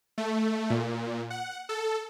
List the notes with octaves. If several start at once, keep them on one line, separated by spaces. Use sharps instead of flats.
A3
A#2
F#5
A4